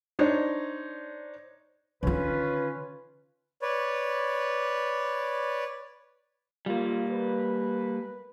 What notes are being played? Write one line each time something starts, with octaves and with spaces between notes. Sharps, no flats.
D4 D#4 C5 C#5
D3 D#3 C#4 F4 B4
B4 C#5 D5
G3 A#3 F4
B4